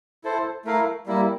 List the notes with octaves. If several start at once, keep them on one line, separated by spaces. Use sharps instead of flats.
E4 A4 C5
A3 E4 A#4 F5
G3 A#3 E4